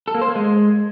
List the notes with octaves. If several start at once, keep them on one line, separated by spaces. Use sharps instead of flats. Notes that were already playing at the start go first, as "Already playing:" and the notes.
A4
A#3
C5
A#3
G#3